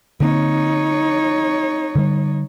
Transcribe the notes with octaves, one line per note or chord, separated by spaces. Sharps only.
D3 A#3 C4 D#4 C#5
D3 G3